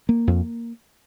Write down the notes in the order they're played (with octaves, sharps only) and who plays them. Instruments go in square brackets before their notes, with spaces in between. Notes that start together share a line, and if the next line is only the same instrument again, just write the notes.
[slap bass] A#3
F2